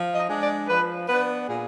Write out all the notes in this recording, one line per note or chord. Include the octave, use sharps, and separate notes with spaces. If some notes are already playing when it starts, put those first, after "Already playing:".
Already playing: F3
D#5
G#3 D4
D5
F3 B4
B3 D4 B4
A#2 G#4